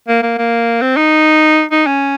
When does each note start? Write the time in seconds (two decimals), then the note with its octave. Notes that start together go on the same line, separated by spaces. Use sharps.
0.08 A#3
0.23 A#3
0.38 A#3
0.82 C4
0.97 D#4
1.71 D#4
1.86 C#4